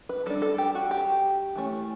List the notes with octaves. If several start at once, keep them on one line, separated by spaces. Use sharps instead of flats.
B4
G3 D4 A4
A4
G4
F#4
G4
E3 A3 C#4